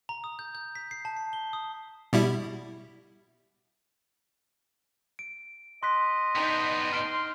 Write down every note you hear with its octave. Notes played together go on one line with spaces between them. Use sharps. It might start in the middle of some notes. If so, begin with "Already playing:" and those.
A#5
D#6
G6
G6
B6
C7
A5
C7
G7
D#6
B2 G3 E4
D7
D#5 C6 F#6 B6
B3 D4 D#4 G5
D#4 C6 F6 D7